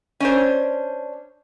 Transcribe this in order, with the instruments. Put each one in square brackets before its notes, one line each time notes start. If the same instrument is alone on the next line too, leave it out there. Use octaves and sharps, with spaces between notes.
[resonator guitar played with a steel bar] C#4 D4 C5